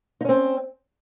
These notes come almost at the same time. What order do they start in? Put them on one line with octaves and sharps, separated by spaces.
D#4 C#4 C4